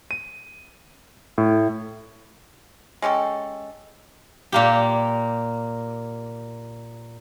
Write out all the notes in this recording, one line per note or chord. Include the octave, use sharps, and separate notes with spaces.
D#7
A2
G#3 C#4 G4 A4
A#2 A#3 G4